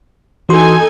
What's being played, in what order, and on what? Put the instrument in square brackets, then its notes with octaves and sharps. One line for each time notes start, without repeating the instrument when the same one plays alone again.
[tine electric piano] E3 F#4 C6 [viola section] D#4 A4 G#5